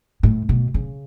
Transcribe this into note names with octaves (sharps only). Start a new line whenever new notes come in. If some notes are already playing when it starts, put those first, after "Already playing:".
A2
B2
C#3